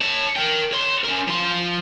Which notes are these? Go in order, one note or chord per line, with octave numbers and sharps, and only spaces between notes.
C#5 A5
A#4 G5
C#5 C6
C#4 A#4
F3 C6